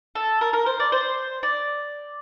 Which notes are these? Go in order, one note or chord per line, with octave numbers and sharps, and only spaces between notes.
A4
A#4
A#4
C5
D5
C5
D5